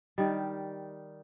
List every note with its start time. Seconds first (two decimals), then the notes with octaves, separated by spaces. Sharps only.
0.18 D#3 G3